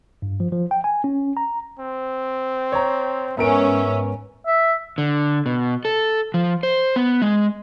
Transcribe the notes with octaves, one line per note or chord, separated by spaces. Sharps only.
G2
F3
F3
G5
G#5
C#4
A#5
C4
C#5 A#5
G#2 B3 C#4 A#4 E5 D7
E5
D3
B2
A4
F3
C5
B3
G#3